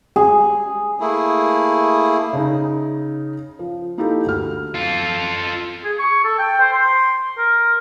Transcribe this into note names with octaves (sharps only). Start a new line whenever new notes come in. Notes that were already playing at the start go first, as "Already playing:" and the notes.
G#4
A3 A#3 E4 G#4
C#3 D#4
F3
A#3 D#4 E4 G4 A4
D2 F6
F4 A4
G#4
C#6
A4
G5
C5
C6
A#4